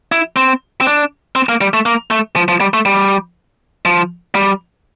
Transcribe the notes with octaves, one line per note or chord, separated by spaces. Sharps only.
E4
C4
C4
D4
C4
A#3
G3
A3
A#3
A3
F3
F3
G3
A3
G3
F3
G3